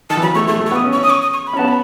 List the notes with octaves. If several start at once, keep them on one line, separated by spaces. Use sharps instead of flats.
D#3 A5
E3
F#3 B5
A3 C#6
A3 C#6
A3
C#6
B3
D#6
C#4
C#6
C#4
D#6
C#6
D#6
C#6
B5
C#4
B3 A5
B5